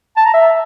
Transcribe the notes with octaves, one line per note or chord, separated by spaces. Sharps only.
A5
A#5
E5